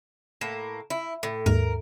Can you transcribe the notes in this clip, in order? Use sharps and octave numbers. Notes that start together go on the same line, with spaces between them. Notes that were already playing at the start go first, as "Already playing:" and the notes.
A2 A#3 E7
E4
A2
D#2 G#2 A#4